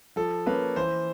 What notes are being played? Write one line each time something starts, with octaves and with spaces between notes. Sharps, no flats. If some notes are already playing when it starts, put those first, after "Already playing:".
F3 A4
A#3 C#4 B4
E3 C5